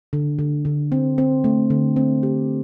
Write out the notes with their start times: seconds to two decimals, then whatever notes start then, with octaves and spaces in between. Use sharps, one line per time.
0.13 D3
0.39 D3
0.65 D3
0.92 C4
1.18 C4
1.44 A3
1.70 D3
1.96 C4
2.23 G4